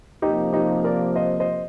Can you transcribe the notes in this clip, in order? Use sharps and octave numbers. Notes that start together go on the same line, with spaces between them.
C3 F3 A#3 D#4 G4
D#4 G4
A#4 D5
C5 D#5
C5 D#5